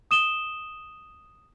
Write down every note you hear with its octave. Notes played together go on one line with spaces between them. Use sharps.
D#6 E7 G7